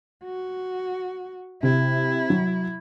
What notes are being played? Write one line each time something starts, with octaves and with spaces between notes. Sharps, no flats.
F#4
C3 E4
F#3